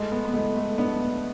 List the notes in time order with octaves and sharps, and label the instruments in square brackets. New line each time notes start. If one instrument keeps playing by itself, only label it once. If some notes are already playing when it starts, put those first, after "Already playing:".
Already playing: [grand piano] G#3 [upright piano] A3
[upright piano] B3
B3
[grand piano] G#3 [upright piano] A3
[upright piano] A3
[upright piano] B3 [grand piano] D4